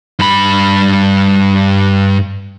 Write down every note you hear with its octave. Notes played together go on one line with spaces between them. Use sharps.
G2 B5